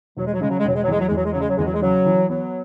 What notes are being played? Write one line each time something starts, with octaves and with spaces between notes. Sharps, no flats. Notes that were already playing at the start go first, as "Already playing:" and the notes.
E1 F#3
G#3
F#3
C#3 G#3
F#3
G#3
E1 F#3
G#3
F#3
E2 G#3
F#3
G#3
E2
F#3
G#3
C#3 F#3
G#3
F#3
E2 G#3
F#3
G#3
C#3 F#3
E3
F#3 B3